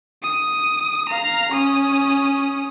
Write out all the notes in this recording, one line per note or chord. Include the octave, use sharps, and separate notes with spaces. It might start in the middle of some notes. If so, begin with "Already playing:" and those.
D#6
F5 A#5
C#4 D#6